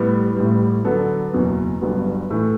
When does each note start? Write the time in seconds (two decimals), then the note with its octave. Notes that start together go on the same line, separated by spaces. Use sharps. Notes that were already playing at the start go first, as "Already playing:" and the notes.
Already playing: A2 G3 B3
0.37 A1 A2 G3
0.85 D3 F#3 B3 D4 A4
1.33 F#1 E2 B2 F#3
1.81 G1 G2 F#3 B3
2.30 A2 E3 A3